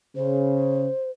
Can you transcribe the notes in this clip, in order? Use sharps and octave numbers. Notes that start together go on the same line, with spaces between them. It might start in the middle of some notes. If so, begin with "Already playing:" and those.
C#3 C5